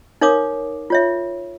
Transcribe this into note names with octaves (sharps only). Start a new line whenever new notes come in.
D#4 A#4 C#5 F5 D6 D#6
F4 C#5 E5